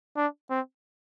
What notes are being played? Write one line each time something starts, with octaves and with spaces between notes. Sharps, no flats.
D4
C4